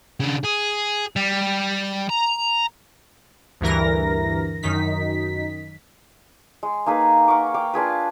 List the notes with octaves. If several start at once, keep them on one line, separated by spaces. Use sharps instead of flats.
C#3 D4
G#4
G3
A#5
D2 G2 E3 A#4 A#6
F#2 D#3 D#4 B6
G#3
A#3 D#4 G#4 B4
A#4 F#5 C#6 D6
F5 G5 D6
D4 F4 G#4 B4